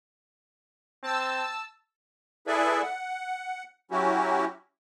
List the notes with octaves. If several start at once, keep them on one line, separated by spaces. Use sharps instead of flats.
C4 A5 E6
E4 G#4 A4 B4 D5 E5
F#5
F#3 C#4 E4 F#4 G4